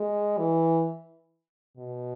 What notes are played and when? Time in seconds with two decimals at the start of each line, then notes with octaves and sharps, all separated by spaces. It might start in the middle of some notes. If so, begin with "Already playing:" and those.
Already playing: G#3
0.38 E3
1.77 B2